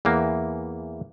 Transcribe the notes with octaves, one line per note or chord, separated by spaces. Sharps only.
E2 E3 A#3